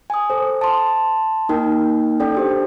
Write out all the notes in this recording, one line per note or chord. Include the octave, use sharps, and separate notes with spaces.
G#5 D#6
A4 C5
A5 C6
A#3 D#4 A#4 G5
C#4 A4 D5 G5
D4 G4 C5